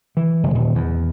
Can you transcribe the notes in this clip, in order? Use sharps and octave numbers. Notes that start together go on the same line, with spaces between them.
E3
F#1
D#1
E2